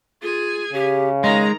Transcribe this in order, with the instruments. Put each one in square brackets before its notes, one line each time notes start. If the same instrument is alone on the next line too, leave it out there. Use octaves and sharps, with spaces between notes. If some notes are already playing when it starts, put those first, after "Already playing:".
[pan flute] F4 [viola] G#4 G#5
[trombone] C#3 [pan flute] G4
[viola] D#3 A#5 [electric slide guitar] G#3 [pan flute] D#5